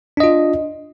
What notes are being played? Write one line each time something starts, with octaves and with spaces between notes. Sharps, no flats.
D4 F4 D#5